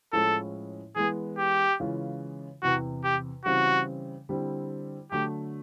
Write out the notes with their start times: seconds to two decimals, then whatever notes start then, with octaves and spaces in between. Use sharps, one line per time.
0.13 A2 F3 G#3 C#4 E4 A4
0.96 E3 G#3 B3 G#4
1.38 G4
1.80 C#3 E3 G#3 C#4 F4
2.63 E2 C3 E3 F#4
3.04 G4
3.45 C#3 E3 G3 C4 F#4
4.29 D3 G3 C4 E4
5.12 D3 F#3 A3 G4